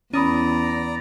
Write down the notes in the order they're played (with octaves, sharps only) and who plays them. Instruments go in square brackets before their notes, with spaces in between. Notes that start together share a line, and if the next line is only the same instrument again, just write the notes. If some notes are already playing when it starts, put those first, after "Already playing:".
[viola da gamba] E2 [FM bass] C#4 [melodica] D5 A#5 [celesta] B5 D#6 D#7